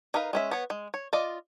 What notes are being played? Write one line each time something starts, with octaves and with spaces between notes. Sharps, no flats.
D#4 A#4 B4 F5
G#3 C#4 E5
B3 C#5
G#3
C#5
F4 D5 D#5